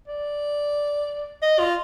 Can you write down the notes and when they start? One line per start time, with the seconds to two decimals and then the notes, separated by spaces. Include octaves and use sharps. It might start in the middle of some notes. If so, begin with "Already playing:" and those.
0.08 D5
1.42 D#5
1.59 F4